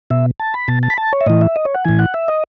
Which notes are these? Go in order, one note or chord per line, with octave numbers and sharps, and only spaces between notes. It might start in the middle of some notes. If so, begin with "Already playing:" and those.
B2 E5
A5
B5
B2 A5
A5
B5
A5
C#5
E5
A2 E3 D#5
E5
D#5
C#5
F#5
A2 E3 G#5
F#5
E5
D#5